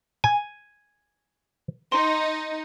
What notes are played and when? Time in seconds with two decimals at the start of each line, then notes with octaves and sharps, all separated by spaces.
0.24 G#5
1.92 D#4 C6